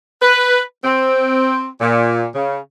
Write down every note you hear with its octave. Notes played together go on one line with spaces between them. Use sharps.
B4
C4
A#2
C#3